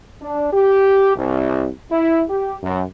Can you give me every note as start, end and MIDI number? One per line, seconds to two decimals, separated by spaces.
0.22 0.48 62
0.53 1.15 67
1.16 1.68 36
1.91 2.23 64
2.29 2.55 67
2.63 2.81 42